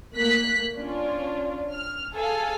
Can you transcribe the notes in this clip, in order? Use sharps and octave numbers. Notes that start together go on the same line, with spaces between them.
A3 A#3 F#6 B6
C#4 D4 F4
F6
G#4 A4 F5 G#5